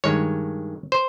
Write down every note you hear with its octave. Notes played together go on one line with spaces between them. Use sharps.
G2 D#3 G#3 C#5
C5